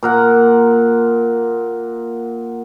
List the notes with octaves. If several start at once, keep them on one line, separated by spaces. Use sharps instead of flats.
A#2 A#4 F#5